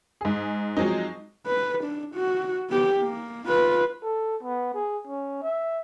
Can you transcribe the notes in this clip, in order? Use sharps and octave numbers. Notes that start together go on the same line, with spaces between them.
G#2 G#4
F3 F#3 G#3 C4 D#4
B4
D4
F#4
B3 G4
A#3
F4 B4
A4
B3
G#4
C#4
E5